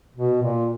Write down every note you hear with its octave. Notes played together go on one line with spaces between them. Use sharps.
B2
A#2